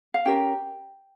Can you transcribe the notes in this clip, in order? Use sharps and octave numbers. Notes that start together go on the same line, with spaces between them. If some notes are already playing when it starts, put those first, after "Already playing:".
F5
C#4 G4 A#4 G5